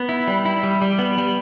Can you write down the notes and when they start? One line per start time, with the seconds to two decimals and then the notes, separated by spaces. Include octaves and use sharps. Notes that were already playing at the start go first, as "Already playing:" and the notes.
Already playing: B3
0.09 E4
0.28 G3
0.45 E4
0.63 G3
0.81 G3
0.99 B3
1.18 G3